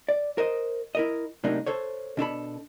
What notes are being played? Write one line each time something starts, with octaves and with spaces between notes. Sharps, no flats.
D5
A#4 C5 D#5
E4 A#4 D#5
A2 C3 F#3 A#3 D4 D#4
A4 C5 C#5
B2 D4 A4 B5